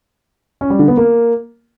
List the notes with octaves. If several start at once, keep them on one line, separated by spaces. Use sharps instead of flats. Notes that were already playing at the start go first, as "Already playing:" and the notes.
C#4
G3
D3
B3
A#3